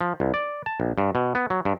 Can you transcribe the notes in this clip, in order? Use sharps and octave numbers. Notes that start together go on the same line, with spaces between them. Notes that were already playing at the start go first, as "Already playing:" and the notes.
F3
C2
D5
A5
A#1
G2
B2
B3
F#3
G2